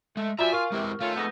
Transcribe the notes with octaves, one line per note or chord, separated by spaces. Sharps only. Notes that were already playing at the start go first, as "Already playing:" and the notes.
G#3 A3
F3 F4 F#4 D5 E5 G#5 A#5
F4 A#4 C#6 F6
C3 G#3 E4 B4
D#3 A3 C#4 F4
F2 G#2 B3 G6 A#6